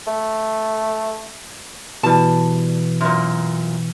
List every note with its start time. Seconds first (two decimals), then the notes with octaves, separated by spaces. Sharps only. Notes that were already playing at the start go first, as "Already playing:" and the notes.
0.07 A3
2.03 B2 E3 G3 A5
3.01 F#2 A#2